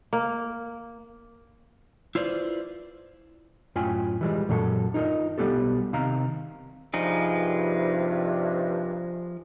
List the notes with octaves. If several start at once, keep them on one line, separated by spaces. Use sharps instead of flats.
A#3
E4 F4 B4 C5 D5
F#2 A2 F4 G5 G#5
E3 G3 G#3
F#2 A#2 F#3 A4
D#4 F4 G4 A#4 D#5
B1 G3 A#3 B3 G4 A4
C3 D#3 F5 A#5
G2 C3 F3 D#4 G#4